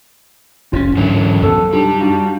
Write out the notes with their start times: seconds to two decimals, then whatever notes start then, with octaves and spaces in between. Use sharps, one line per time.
0.73 F1 C#3 C#4 F4
0.97 D#2 G#2 D3 E3 F#3 C#4 D4
1.42 F#2 C3 F3 B3 A4
1.73 G3 D4 D#4 F4 G4
2.00 D4 D#4 F4 F#4